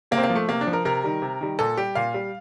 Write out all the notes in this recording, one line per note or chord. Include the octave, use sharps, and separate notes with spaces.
C3 A#3
C4
A#3
F3
A3
C3 A#3
D4
F3
A#4
C3 A#4
D#3 G3
C3
D#3 G3
A#2 A4
G3 G4
A#2 F5
G3